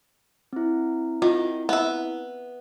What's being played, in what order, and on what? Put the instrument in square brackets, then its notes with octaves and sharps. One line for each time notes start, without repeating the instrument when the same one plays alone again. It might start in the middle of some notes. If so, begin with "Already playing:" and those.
[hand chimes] C4 E4
[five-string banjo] D#3 [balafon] F4
[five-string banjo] B3 E5